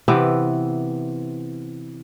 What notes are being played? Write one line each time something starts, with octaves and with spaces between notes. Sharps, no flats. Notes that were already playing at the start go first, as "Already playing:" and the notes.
C3 E3 B3 G5